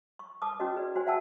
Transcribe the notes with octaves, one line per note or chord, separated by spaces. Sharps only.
C#6
B4 A5 D6 D#6
C#4 D#4 E4 F#4 B4 D#5
G#4 B4 D5
F#4 C5 D5 G#5
E5 F#5 G5 A5 E6